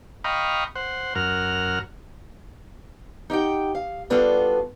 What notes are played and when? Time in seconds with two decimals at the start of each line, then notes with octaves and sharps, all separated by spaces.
0.24 D#5 F5 G5 A#5 B5 C#6
0.75 C5 F#5
1.15 F#2 A#4 F#5 F6
3.30 D#4 G4 F#5 G5
3.75 F5
4.10 G3 B3 D4 F4 F#4 A4